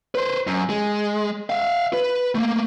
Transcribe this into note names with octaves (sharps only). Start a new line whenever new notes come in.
B4 C5
F#2
G#3
E5 F5
B4
A3 A#3